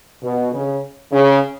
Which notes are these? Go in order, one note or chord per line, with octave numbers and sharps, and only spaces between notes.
B2
C#3
C#3